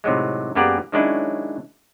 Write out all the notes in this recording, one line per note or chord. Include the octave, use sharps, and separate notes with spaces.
A2 C3 D#3 F#3 G#3
F#2 A#3 B3 G4 G#4 D5
D#3 F#3 G#3 C#4 D4 E4